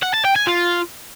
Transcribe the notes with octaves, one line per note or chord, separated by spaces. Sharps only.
F#5
A5
G5
G#5
F4